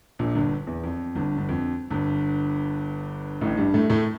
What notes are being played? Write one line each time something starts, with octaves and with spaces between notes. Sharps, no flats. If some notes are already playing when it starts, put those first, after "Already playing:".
A#1 A#2
G1 G2
E2
F2
G1 G2
G2
F2
G1 G2
A1 A2
G2 G3
A2 A3
A2 A3